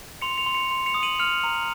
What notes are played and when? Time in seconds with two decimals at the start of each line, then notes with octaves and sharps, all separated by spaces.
0.22 C6 C#7 F7
0.37 C#7 F7
0.46 C6
0.54 C#7 F7
0.71 C6
0.86 C#7 F7
0.94 D#6
1.03 D#7 F#7
1.19 F6 C#7 F7
1.44 A#5